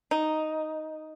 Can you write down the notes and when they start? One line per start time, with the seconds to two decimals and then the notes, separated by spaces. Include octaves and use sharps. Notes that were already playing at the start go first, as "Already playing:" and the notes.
0.11 D#4